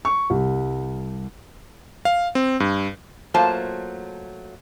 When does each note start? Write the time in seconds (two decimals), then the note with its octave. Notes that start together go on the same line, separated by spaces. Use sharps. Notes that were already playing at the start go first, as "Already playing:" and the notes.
0.05 C#6
0.30 C2
2.05 F5
2.35 C4
2.60 G2
3.34 F#3 A3 A#3 F4 C5 A5